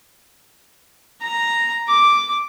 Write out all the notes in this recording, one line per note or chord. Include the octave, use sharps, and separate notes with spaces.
A#5
D6